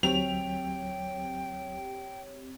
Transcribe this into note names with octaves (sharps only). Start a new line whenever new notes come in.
D2 F#3 C4 G4 C#5 G5 F7